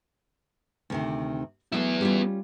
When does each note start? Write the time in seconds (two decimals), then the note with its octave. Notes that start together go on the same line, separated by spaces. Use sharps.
0.90 D2 C3 D#3
1.72 F#3 G#3 A3 B3 E4
2.01 G3 C#4 F4